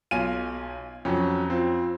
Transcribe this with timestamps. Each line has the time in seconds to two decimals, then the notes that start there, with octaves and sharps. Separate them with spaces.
0.11 B1 F4 G#5 D#7
1.05 F2 F#3 C#4
1.50 C4 F4